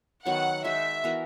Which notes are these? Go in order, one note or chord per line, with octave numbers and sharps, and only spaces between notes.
D#3 F#3 B3 F#5
G#3 D#4 F#4 E5
E3 B3 F#4 A#4